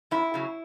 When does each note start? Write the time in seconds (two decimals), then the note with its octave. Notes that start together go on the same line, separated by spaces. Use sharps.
0.11 F#2 E4
0.34 C#3 F#3